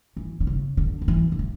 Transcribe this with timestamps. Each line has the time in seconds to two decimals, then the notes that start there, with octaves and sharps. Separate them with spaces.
0.17 E3
0.40 D3
0.47 C#3
0.77 D3
1.02 D3
1.08 E3
1.32 C#3
1.39 D3